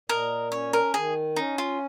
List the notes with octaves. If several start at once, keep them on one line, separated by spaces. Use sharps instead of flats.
A#2 A#4 D#5
C#4 C#5
A#4
D#3 G#4
C#4 D#4
F4